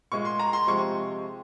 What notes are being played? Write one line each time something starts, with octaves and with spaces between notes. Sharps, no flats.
A#2 G#3 C#6
C6
A#5
C6
C3 F3 G#3 C#6